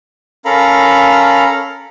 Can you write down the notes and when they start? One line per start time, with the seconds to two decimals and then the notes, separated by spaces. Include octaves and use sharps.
0.45 C#4 A4 A#4 F5 A#5 B5